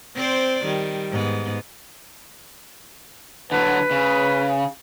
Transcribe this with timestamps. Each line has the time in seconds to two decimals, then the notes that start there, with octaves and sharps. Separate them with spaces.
0.15 C4 C5 D5
0.65 D#3 G3
1.11 G#2 B3
3.52 D3 F#3 B4
3.91 C#3